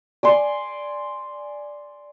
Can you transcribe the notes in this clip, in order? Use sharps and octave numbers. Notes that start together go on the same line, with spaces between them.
D5 G#5 C6